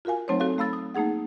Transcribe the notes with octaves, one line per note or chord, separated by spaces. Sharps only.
F4 F#4 A#4 F5 G#5
F#3 A3 C4 D#4 C5 C#5
C4 F#4 A4 F5
A3 F5 B5 E6 A6
D#6
A3 A#3 D#4 G#4 F#5